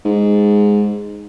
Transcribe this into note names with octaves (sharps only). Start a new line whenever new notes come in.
G#2